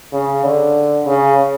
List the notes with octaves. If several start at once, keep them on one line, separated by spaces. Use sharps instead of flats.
C#3
D3
C#3